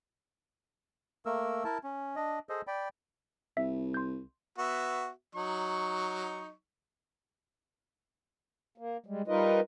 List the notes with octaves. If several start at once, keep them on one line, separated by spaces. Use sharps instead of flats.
A3 A#3 A#4 E6
E4 A#4 A5
C#4
D4 D#5
G#4 A4 C5 D#5
D5 G5 B5
C2 E5
C6 G6
B3 F#4 E5
F#3 D#4 C#6
A#3
G3 G#3
G3 D#4 F4 A#4 B4 D#5